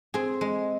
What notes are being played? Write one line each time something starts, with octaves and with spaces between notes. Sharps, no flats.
C4 G#4
G#3